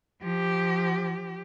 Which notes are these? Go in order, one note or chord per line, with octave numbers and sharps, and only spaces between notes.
F3 G4